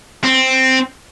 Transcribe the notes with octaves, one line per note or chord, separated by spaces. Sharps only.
C4